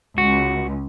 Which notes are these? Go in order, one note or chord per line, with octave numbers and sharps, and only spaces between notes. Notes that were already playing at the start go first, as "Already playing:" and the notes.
C#2 F#4